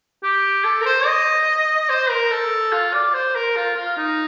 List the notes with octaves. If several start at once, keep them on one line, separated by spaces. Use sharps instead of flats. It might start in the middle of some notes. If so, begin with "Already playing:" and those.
G4
A4
A#4
C5
D#5
C5
A#4
A4
F4
D5
C5
A#4
F4
F4
D#4